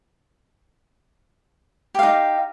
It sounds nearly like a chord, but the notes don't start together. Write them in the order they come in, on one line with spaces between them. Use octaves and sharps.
G4 F5 D#4